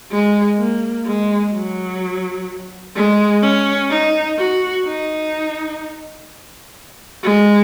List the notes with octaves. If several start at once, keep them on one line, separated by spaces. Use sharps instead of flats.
G#3
A#3
G#3
F#3
G#3
C#4
D#4
F#4
D#4
G#3